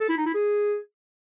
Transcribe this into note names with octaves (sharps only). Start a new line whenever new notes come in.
A4
E4
D#4
E4
G#4